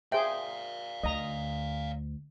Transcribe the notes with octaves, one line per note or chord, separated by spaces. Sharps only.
G#4 C5 D5 E5 F5 G5
D2 D#5 A#5